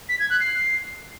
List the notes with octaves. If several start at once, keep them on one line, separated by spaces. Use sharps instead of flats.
B6
G#6
F#6
C7